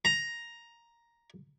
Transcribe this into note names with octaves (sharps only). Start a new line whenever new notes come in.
A#5